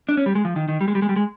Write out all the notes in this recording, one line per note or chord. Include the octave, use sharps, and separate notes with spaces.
D4
C#4
G3
G#3
F3
D#3
D#3
G3
G#3
G3
G#3
G3
G#3